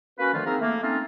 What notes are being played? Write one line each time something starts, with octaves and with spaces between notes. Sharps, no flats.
A#3 C#4 F#4 B4
D3 D#3 F3 A3 F4
A#3 C4 D#4 G#4 A#4
A3 A#3
A3 C4 C#4 D#4 F4